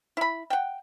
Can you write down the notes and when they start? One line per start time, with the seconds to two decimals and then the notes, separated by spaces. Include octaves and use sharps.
0.17 E4 B5
0.50 F#5 G5